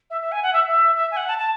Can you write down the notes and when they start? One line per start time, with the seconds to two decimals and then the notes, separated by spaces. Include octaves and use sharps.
0.10 E5
0.21 E5
0.32 G#5
0.42 F#5
0.53 E5
0.68 E5
0.95 E5
1.11 G#5
1.16 F#5
1.27 A5
1.38 A5